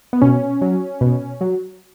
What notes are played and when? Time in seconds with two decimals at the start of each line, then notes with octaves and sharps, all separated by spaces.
0.13 B3
0.22 B2 C#4
0.61 F#3
1.01 B2
1.41 F#3